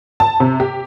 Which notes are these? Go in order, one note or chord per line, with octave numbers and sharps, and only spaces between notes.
A5
C3
G4